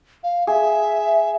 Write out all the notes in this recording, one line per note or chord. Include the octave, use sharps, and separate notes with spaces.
F5
G#4 E5